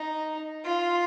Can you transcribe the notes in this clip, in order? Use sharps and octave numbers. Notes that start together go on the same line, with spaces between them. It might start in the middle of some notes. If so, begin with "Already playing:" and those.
Already playing: D#4
F4